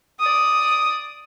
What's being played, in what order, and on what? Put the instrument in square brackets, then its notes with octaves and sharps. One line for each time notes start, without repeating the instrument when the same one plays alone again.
[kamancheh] D5 D#6